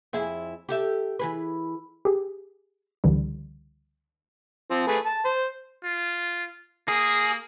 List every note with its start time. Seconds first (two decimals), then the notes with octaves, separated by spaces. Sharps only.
0.13 F2 E4 G#4
0.69 G4 A4 E5
1.19 E3 G#4 B4
2.05 G4 G#4
3.04 C#2 D3 E3 G3
4.70 F3 C4
4.87 A3 G#4 B4
5.05 A5
5.25 C5
5.84 F4
6.88 A#3 G#4